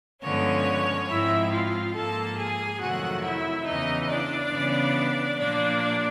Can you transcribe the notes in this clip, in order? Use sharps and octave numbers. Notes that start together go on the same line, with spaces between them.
G2 D3 F3 G#3 B3 C#4 C#5
G#2 F3 G#3 C4 E4 E5
F4 F5
G#2 F3 A#3 A4 A5
G#4 G#5
F2 C3 D#3 F#3 A3 F#4 F#5
E4 E5
E2 C#3 E3 D#4 D#5
D4 D5
C#3 E3 G3 B3
A#2 F3 A#3 D4 D5